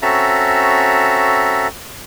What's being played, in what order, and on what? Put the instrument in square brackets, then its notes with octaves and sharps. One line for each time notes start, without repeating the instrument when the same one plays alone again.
[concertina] C4 C#4 F#4 A4 E5 A#5